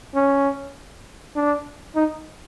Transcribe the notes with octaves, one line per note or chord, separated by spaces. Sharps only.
C#4
D4
D#4